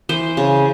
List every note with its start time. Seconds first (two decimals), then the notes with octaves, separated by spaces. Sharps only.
0.09 E3 C5
0.37 C#3